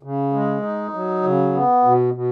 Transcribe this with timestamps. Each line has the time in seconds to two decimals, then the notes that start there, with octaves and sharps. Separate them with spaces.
0.03 C#3
0.33 G#3
0.63 D#4
0.94 F#3
1.23 C#3
1.53 B3
1.84 B2
2.14 B2